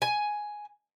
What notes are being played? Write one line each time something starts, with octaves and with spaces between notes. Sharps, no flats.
G#5